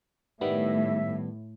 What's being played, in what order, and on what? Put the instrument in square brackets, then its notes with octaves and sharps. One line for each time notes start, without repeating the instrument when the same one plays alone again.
[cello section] A2 [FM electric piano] D#3 G3 B3 [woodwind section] E5